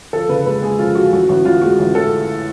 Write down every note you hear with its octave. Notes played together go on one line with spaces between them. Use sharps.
F3 A4
C#3 B4
G#3 B4
G#3 G#4
F3 F4
F3 F#4
A1 F#4
A1 F#4
A1 F4
G#3 F#4
A1
A2 A4